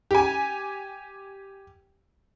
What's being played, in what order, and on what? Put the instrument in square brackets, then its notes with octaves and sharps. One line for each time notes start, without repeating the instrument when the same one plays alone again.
[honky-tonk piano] G4 G#5